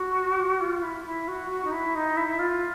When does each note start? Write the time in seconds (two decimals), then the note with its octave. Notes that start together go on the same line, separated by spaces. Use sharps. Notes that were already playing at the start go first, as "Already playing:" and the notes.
Already playing: F#4
0.60 F4
0.82 E4
1.05 E4
1.28 F#4
1.50 F#4
1.65 D#4
1.72 E4
1.95 D#4
2.17 E4
2.28 E4
2.39 F4